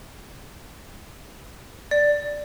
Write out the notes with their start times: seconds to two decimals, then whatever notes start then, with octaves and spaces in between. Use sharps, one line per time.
1.91 D5